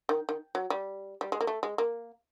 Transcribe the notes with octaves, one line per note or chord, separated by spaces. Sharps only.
D#3
D#3
F#3
G3
G3
G#3
A#3
A3
G#3
A#3